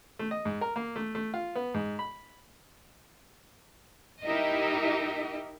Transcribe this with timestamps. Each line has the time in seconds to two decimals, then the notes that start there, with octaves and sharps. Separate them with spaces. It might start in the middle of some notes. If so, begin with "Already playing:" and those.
0.19 A3
0.31 D#5
0.45 G#2
0.61 A#4
0.76 A#3
0.96 A3
1.15 A3
1.34 F4
1.55 B3
1.74 G#2
1.99 B5
4.24 D#4 E4 G4 A#4 D#5 E5